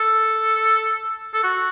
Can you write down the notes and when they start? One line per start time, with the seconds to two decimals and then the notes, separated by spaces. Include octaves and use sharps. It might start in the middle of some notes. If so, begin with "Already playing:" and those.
Already playing: A4
1.34 A4
1.44 F#4